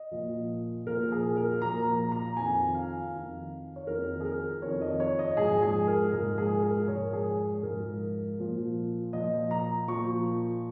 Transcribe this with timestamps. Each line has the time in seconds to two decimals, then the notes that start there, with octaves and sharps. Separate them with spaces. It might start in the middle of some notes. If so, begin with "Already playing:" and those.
Already playing: D#5
0.11 A#2 F3
0.87 A#2 F3 A#4
1.12 G#4
1.37 A#4
1.62 A#2 F3 A#5
1.87 A#5
2.12 A#5
2.37 F2 D#3 G#5
2.74 F5
3.12 F2 D#3
3.76 C#5
3.87 F2 D#3 A#4
4.20 G#4
4.25 A#4
4.62 F2 D#3 C#5
4.82 D#5
5.00 C#5
5.19 D#5
5.37 G#2 F3 G#4
5.62 G#4
5.88 A#4
6.12 G#2 F3 A#4
6.38 G#4
6.63 A#4
6.87 G#2 F3 C#5
7.13 G#4
7.63 G#2 F3 A#4
8.38 A#2 F3
9.13 A#2 F3 D#5
9.51 A#5
9.88 A#2 F3 C#6